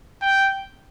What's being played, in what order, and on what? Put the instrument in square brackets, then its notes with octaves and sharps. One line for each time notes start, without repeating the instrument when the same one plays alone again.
[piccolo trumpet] G5